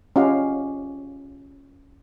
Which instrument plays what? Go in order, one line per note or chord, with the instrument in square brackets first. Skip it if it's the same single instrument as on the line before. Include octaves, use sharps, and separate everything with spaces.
[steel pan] C#4 F4 G4 D#5 F5 F#5